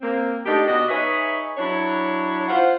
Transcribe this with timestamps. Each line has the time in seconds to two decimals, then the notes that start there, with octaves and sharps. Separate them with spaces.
0.02 A#3 C4
0.46 A3 D4 D#4 G4
0.67 B2 B3 F#4 D5 D#5
0.89 D#4 G#4 B4 C#5 D#5 E5
1.57 F#3 D4 E4 C#5
2.48 F4 C5 F#5